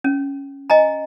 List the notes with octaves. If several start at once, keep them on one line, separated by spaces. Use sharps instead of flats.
C#4
D#5 G#5 A#5